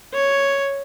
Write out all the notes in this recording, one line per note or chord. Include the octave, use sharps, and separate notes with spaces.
C#5